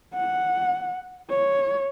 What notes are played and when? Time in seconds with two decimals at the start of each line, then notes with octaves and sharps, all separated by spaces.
0.15 F#5
1.30 C#5